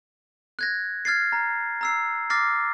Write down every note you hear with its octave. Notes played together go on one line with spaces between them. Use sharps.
F#6 G#6 A#6
F6 G#6 A6 C7
A#5
A#5 E6 C7
D6 F6 A6 A#6 C7